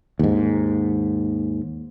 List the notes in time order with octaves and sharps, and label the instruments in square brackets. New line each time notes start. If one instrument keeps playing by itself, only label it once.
[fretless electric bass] D#2 G#2